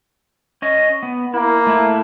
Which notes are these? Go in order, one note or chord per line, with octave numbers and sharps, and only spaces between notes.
C#4 D#5
B3
A#3 E4
A3 E4